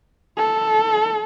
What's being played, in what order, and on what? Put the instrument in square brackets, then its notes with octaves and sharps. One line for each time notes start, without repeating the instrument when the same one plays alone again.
[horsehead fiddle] A4